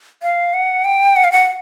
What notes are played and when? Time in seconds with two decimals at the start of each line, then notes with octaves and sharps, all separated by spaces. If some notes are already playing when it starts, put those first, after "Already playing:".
0.22 F5
0.54 F#5
0.85 G5
1.16 F#5
1.24 F5
1.32 F#5